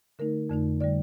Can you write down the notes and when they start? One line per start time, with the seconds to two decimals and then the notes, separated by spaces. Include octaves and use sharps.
0.19 D3 A3 D#4 A#4
0.50 F2 D3 A3 D#4
0.81 D3 G3 D5